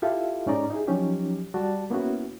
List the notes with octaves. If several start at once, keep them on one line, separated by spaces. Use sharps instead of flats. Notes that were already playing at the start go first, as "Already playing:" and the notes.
E4 F4 G4 A4 E5 F5
G#2 C#4 D#4 D5 A#5
D#4 E4 G4 G#4
F3 F#3 C#4 D#4 G4
G3 F#4 D5 A5
A#3 B3 C#4 E4 F#4